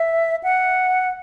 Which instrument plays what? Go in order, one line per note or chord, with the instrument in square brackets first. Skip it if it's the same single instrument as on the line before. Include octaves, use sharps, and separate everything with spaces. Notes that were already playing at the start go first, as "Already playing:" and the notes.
Already playing: [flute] E5
F#5